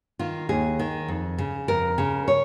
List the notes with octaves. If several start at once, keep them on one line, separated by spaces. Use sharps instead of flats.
D#3 F4
D#2 G#4
D#3
F2
C#3
F2 A#4
C#3
C#5